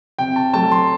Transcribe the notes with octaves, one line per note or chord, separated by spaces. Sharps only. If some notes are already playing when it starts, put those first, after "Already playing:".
C3 G5
A5
F#3 A3 A5
C6